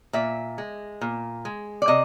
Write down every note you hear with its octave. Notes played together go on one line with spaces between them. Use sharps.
A#2 E5
G#3
A#2
G#3
D5
C3 D#5